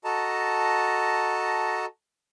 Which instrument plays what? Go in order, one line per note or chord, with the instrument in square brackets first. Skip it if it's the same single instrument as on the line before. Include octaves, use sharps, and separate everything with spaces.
[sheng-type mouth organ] F#4 A4 D#5 A5 A#5